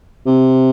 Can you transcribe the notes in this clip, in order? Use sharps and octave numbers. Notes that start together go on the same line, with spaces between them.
C3